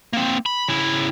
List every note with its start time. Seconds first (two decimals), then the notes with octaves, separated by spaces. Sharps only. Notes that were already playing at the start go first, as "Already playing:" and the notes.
0.13 A#3 C4
0.46 B5
0.68 C#3 E4